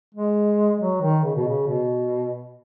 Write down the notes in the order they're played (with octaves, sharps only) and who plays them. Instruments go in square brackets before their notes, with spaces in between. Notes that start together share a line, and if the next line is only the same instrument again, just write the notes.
[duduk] G#3
F#3
D#3
C#3
B2
C#3
B2